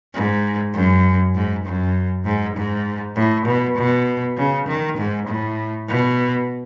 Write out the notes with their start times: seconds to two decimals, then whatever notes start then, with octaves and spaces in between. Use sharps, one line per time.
0.14 G#2
0.74 F#2
1.35 G#2
1.65 F#2
2.25 G#2
2.56 G#2
3.16 A2
3.46 B2
3.77 B2
4.38 C#3
4.68 D#3
4.98 G#2
5.28 A2
5.88 B2